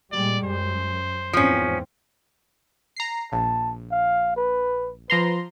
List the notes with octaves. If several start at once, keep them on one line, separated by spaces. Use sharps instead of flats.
A#2 G3 G#3 D5
F#2 C5
E2 G#2 F3 C4 C#4
A#5 C7
A#1 A5
F5
B4
F3 B4 A#5 C6